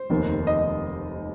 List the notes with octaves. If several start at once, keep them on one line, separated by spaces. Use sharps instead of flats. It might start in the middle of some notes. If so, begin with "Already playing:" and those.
Already playing: C5
F1 D#2 D#3
D#5
D#5